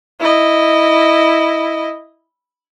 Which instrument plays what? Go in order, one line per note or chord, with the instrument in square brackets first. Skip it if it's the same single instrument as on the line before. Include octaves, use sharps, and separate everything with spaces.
[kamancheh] E4 D#5